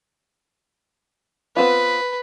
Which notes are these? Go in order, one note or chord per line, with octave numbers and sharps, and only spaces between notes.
B3 C4 F4 B4